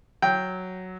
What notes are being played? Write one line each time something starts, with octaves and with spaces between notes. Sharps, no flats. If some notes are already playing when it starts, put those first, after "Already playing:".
F#3 G5